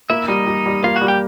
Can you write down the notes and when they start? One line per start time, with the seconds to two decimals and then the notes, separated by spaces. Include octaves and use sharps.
0.10 A#3 E4 E5
0.28 G3 D#4 D#5
0.46 G3
0.66 G3
0.84 A#3 F4 F5
0.96 F#4 F#5
1.01 G3
1.08 G4 G5